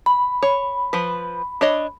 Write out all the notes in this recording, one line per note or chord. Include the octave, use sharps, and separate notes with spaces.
B5
C#5
F3 B4
D4 C#5 D#5